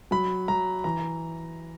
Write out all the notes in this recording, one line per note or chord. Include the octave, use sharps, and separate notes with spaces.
F#3 B5
F#3 A#5
E3 A#5